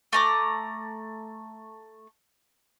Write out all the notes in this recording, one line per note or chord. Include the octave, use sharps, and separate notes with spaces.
A3 A#5 D6